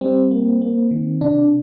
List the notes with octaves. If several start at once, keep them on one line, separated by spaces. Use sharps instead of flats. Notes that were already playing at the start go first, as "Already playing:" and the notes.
G3 C4
A#3
A#3
D#3
C3 D4